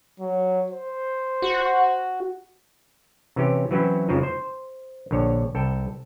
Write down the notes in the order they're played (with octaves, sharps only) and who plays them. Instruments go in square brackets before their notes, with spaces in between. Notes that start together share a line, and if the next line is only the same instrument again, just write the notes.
[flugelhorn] F#3
C5
[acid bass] F#4
[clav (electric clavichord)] C3 E3 C#4 G4
E3 F#3 C4 C#4 E4
F2 C#3 F3 G#3 D#4
C5
A#1 D3 C#5
C2 A4 G5